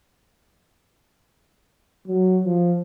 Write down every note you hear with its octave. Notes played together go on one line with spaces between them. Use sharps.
F#3
F3